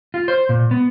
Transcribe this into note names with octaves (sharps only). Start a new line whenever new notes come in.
F4
C5
A#2
B3